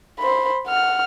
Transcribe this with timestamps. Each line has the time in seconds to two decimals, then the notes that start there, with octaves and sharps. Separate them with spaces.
0.19 C5 B5
0.68 F#5 F6